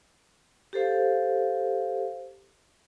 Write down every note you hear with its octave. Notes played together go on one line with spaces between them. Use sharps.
G4 A4 C5 F5